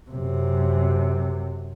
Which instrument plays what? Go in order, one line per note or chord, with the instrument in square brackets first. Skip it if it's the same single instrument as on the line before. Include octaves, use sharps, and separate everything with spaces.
[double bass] F#2 C3